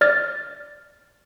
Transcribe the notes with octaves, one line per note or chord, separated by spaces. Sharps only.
D5 F6 A6